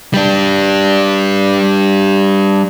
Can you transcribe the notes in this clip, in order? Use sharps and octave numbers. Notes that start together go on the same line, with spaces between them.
G3 D4